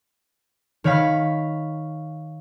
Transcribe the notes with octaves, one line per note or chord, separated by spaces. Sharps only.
D#3 C#5 F5 B5 F6